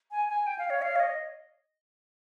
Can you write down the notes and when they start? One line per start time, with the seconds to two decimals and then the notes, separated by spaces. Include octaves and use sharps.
0.11 G#5
0.29 G#5
0.47 G5
0.59 F5
0.70 C#5
0.82 F5
0.96 C#5
1.00 D#5